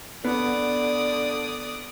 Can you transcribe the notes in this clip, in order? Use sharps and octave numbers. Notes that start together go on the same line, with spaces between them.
D3 B3 D5 D#6